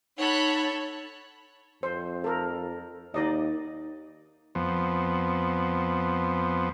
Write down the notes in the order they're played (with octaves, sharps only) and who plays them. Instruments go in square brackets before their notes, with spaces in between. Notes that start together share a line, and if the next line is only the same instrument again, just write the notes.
[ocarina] D#4 [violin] A4 C#5 [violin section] F#5 B5 F#6
[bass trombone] F2 [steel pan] C5
[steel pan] A4 A#4
[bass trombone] D#2 [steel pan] D#4 D5 D#5
[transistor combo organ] F2 F3 B3